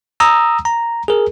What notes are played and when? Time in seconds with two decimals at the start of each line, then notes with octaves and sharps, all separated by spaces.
0.20 A#5 D#6 E6
0.65 A#5
1.08 G#4 A#4